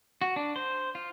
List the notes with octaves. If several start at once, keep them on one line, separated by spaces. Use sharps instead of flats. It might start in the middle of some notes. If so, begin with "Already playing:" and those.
F#4
D4
C5
F4